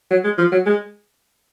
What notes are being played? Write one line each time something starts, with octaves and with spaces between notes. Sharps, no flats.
F#3
G#3
F3
F#3
G#3